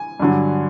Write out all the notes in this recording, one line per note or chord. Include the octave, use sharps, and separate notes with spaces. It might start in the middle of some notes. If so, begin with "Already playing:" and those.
Already playing: G#5
G2 D3 F#3